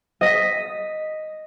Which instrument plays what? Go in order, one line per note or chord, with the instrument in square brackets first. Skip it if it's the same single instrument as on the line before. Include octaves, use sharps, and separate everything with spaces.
[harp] D#5 A#6 B6